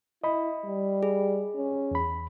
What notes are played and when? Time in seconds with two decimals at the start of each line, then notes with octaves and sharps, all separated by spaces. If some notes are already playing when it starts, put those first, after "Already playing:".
0.24 E4 D#5 B5
0.65 G3
1.03 G#4
1.56 C#4
1.91 E2 B5